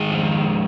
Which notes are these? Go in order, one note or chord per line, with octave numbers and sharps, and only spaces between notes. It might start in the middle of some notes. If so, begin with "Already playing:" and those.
Already playing: D#3 G#3 G#4
F2